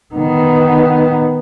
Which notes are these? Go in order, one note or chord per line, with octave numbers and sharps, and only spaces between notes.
D#3 B3